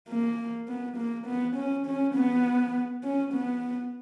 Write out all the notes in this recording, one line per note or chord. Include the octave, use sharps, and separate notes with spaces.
A#3
B3
A#3
B3
C#4
C#4
B3
C#4
B3